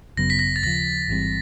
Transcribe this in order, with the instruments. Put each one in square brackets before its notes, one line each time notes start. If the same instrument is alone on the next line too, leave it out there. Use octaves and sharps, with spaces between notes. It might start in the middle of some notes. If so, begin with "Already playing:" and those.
[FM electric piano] G#1 F#2 C#3 F#3 B3 [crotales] A#6
[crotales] B6
A#6
A6
[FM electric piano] D#2 C#3 F3 [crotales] A#6
[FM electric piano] A1 G#2 E3 G3 C4